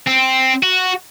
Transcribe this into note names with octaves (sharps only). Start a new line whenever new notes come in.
C4
F#4